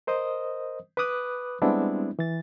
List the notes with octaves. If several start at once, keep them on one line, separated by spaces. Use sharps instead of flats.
A#4 C5 D#5 D#6
B4 B5 D6 D#6 F#6
G3 G#3 B3 C4 D4 E4
E3 A6